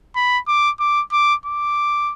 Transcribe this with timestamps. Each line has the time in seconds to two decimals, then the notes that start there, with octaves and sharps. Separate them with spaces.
0.16 B5
0.48 D6
0.80 D6
1.12 D6
1.46 D6